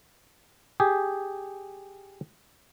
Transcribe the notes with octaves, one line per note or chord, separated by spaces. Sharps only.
G4 G#4